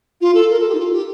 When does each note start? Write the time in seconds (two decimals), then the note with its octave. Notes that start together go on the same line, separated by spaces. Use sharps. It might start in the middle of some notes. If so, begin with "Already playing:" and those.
0.21 F4
0.34 A4
0.50 A#4
0.59 A4
0.68 G4
0.74 D#4
0.78 F4
0.92 G4